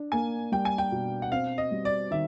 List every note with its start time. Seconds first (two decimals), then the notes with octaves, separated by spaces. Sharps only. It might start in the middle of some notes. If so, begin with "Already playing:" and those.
Already playing: D4
0.12 A#3 G#5
0.52 G3 G5
0.65 G#5
0.78 G5
0.92 B2
1.22 F#5
1.32 C4 F5
1.58 D#5
1.71 G3
1.85 D5
2.11 D#3 E5